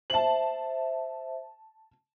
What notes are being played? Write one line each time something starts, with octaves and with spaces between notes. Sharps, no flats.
C5 E5 A5 F#7